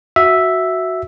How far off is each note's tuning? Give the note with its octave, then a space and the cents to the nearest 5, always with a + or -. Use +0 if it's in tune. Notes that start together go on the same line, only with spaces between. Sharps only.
F#4 +0 E5 +0